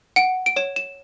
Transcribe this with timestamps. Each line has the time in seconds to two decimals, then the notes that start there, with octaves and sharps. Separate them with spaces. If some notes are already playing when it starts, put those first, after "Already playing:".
0.16 F#5 D7
0.46 D7
0.56 C#5 E7
0.76 E7